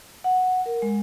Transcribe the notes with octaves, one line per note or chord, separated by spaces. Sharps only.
F#5
A#4
G#3